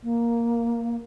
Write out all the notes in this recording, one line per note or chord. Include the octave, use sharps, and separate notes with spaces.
A#3